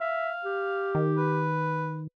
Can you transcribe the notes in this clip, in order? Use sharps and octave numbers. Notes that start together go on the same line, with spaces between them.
E5 F5
G4
D#3
B4